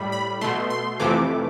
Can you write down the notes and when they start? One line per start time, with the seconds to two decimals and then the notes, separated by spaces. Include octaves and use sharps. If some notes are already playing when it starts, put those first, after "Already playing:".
Already playing: A2 G3 B5
0.12 B5
0.41 B2 A3 C6
0.70 C6
1.00 F2 C3 E3 A3 D6